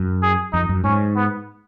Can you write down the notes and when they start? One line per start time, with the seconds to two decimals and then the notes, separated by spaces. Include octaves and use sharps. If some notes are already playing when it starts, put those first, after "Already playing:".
Already playing: F#2
0.23 G#4
0.53 F2 D#4
0.69 F#2
0.84 G#2 C#4
1.16 B3